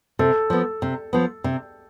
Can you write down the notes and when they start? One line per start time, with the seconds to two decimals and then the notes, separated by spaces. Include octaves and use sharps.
0.19 C3 A4
0.50 F3 B3
0.82 C3
1.13 F3 B3
1.44 C3